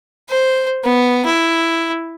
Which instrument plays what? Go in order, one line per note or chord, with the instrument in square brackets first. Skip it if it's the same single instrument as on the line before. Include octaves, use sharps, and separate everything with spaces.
[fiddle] C5
B3
E4